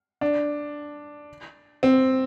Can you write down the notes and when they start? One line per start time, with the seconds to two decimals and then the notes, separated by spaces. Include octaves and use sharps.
0.21 D4
1.83 C4